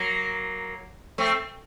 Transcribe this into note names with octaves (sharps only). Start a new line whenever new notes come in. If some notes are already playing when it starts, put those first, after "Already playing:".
Already playing: F#3 A#3
A3 C4